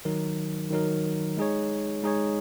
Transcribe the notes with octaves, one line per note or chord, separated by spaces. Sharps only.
D#3 F#3 D#4 A#4
D#3 F#3 D#4 A#4
G#3 D#4 G#4 C#5
G#3 D#4 G#4 C#5